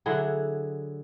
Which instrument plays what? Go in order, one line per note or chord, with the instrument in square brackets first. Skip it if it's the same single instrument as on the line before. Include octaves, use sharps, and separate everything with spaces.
[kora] D3 F#3 E4 G#4